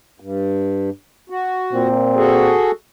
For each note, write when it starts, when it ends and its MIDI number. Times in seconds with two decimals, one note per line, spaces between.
0.20 0.90 43
1.30 1.88 66
1.73 2.53 46
1.73 2.53 60
2.15 2.71 66
2.15 2.71 68
2.15 2.71 69